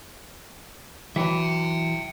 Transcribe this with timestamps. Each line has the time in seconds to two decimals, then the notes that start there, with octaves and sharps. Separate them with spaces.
1.16 E3 F#3 E5 G5